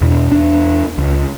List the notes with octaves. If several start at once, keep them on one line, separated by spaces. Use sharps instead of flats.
E2 B2
E2 D4
C#2